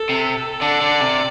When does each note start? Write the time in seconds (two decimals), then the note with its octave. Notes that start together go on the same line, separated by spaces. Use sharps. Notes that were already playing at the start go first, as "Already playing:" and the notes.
Already playing: A4
0.09 C3
0.61 D3 D5
0.81 D3
1.01 C3